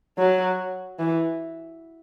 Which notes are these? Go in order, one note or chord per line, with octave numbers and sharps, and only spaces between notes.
F#3
E3